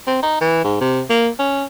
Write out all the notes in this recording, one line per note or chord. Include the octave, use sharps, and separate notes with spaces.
C4
D#4
E3
G#2
C3
A#3
C#4